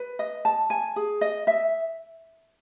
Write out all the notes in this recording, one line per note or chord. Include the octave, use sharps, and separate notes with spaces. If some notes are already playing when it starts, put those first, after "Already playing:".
Already playing: B4
D#5
A5
G#5
G#4
D#5
E5